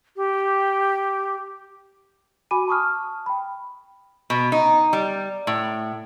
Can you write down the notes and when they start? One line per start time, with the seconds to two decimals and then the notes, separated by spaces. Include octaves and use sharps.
0.16 G4
2.51 F#4 G#5 B5 D6 D#7
2.68 A5 C#6 D#6 F6
3.26 G5 B5
4.30 B2
4.52 D#4
4.93 G3
5.47 A2